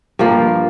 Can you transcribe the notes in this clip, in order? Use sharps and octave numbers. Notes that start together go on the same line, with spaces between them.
G2 F3 A#3